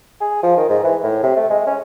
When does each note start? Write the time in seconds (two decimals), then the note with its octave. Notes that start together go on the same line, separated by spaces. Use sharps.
0.20 G#4
0.43 F3
0.57 D#3
0.69 G#2
0.84 E3
1.04 A2
1.23 C3
1.36 A3
1.49 G#3
1.67 C#4